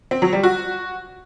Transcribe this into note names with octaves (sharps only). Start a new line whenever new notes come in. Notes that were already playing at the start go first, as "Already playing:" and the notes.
C4
F#3
G3
F#4